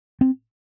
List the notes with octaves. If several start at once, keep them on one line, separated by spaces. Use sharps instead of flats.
C4